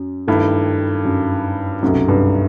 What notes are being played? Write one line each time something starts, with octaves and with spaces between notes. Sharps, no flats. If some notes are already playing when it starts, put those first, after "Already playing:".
Already playing: F#2
G2 D#3 A3 E4
F#2
C2 F#2 B2 F#3 A3 D#4
G2